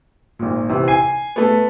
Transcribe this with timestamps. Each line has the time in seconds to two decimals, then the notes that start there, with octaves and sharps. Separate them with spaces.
0.39 G#1 A#2
0.69 C3 E3
0.88 G#5 C7
1.36 A3 B3